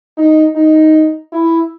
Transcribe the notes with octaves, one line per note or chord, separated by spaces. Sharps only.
D#4
D#4
E4